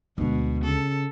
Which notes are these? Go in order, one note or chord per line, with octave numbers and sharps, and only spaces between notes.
D2 B2 G#3
C#3 A4